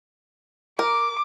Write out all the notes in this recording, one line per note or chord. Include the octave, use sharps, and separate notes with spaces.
A#4 D6